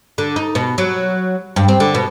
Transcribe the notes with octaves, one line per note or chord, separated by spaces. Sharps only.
D3
D#4
B2
F#3
G2
C4
D3
B2